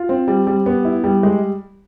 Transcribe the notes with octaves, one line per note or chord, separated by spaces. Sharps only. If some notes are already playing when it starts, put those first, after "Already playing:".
Already playing: F4
C4
G3
G3
B3
E4
G3
G#3